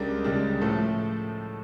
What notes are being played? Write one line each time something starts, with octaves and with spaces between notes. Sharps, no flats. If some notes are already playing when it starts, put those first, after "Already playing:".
Already playing: C#2 C#3 G3 D4 A#4
C#2 C#3 G3 D4
A2 F3 A3 A4